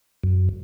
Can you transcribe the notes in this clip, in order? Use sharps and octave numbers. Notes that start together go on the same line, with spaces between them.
F#2